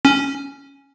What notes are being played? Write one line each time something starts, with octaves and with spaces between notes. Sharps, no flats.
C#4